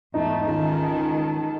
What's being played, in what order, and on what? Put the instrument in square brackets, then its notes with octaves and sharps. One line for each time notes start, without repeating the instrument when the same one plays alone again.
[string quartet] E2 G#2 A3 [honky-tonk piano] D#4
[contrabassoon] C#2 [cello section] D#3 [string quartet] A4